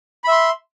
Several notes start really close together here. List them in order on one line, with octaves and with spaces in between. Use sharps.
B5 E5 C6